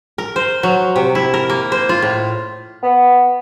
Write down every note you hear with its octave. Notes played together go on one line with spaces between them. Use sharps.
A#4
C5
F#3
C3
E4
A#4
A#3
C5
F4
A2
B3